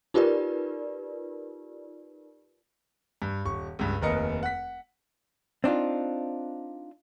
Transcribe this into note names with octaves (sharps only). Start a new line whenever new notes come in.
D#4 F4 G4 A#4 B4 D5
G2
D#1 C#6
C#2 G2
F1 D#2 A#4 B4 D#5 C#7
F#5 B6
C4 D4 D#4 F4